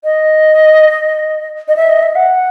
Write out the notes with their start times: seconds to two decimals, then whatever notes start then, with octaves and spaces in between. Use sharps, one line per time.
0.04 D#5
1.68 D#5
1.77 E5
1.89 D#5
2.03 E5
2.15 F#5